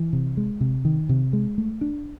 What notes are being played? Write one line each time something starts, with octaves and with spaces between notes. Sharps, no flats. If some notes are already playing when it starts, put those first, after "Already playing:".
Already playing: E3
C3
G#3
C3
D#3
C3
G#3
A3
D4